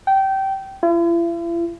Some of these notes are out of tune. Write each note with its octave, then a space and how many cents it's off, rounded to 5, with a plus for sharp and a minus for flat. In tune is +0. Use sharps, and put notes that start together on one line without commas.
G5 -20
E4 +45